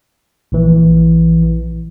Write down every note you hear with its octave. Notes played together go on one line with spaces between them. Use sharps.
A#1 E3